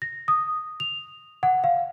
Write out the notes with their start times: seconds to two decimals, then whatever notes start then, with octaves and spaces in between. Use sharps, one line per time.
0.02 A#6
0.28 D#6
0.80 F7
1.43 F#5
1.64 F5